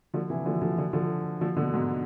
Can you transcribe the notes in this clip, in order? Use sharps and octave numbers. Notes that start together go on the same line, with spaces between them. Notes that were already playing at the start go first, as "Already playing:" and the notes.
D3 F3
C3 E3
D3 F3
D3 F3
D3 F3
D3 F3
D3 F3
B2 D3
G#2 B2